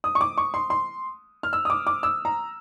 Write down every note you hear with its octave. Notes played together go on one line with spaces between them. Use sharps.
D#6
C#6
D6
C#6
C6
C6
F6
E6
D#6
D6
D6
E6
A#5